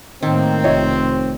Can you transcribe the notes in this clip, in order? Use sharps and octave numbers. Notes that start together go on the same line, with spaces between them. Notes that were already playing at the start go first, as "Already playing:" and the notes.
A2 D#3 A#3 C4
F1 D#4 C#5 E5